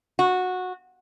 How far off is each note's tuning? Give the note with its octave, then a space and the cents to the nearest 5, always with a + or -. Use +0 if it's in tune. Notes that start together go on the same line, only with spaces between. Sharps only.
F#4 -15